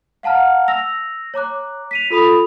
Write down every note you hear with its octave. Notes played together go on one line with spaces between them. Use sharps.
F5 F#5 A5 A#5 F6
E6 A#6 F7
C#5 A#5 D6 F#6
B6 D#7 F7
F4 A4 B5 D#6 F7